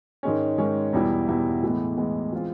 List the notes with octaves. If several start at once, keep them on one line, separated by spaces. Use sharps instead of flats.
G#2 D#3 G#3 C#4
G#2 D#3 G#3 C#4
E2 B2 G3 B3 E4
E2 B2 G3 B3 E4
A2 E3 G#3 B3
A2 E3 G#3 B3
E3 G#3 C4 F4